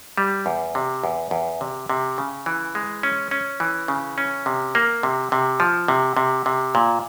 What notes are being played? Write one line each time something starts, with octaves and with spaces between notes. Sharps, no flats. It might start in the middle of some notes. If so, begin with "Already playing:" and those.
G3
E2
C3
E2
E2
C3
C3
C#3
E3
G#3
C#4
C#4
E3
C#3
C#4
C3
A#3
C3
C3
F3
C3
C3
C3
A#2